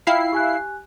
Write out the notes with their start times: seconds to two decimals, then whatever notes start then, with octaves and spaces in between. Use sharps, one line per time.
0.07 E4 F4 F5 G5 B5 C7
0.33 G4 G#5 F#6